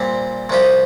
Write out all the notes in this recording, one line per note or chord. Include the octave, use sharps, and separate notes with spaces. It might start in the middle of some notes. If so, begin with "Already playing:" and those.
Already playing: A#2 G3 C4
C2 C3 F3 D#4 G4